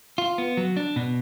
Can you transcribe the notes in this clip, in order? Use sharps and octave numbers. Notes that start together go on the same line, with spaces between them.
F4
B3
F#3
D4
B2